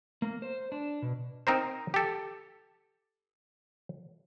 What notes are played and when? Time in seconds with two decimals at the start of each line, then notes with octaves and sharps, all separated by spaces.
0.22 A#3
0.42 C5
0.72 D4
1.02 B2
1.47 C4 D#4 A#4 C5
1.94 G4 A4